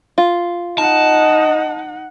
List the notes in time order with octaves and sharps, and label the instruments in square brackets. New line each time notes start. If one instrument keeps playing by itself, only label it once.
[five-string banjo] F4
[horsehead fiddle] D#4 F#5 [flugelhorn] D#5 [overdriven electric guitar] A5